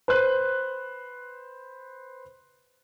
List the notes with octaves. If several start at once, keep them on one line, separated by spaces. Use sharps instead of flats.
B4 C5 F#6